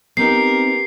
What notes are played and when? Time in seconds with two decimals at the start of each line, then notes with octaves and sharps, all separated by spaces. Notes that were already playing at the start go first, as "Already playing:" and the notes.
0.17 B3 C4 D#4 G4 A#4 C7